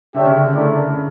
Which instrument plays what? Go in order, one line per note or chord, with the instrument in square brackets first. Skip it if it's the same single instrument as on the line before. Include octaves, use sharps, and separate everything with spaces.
[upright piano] D3 [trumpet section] D4 G4 C#5 E5 G5
[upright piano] C#3
D3
[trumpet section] A3 E4 A#4 D5
[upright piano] C#3